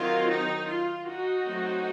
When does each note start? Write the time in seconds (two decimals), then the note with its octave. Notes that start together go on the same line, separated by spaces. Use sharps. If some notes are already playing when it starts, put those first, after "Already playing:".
Already playing: D#3 F#3 C4 F4
0.29 D#4
0.68 F4
1.07 D#4 F#4
1.46 F#3 A3 C4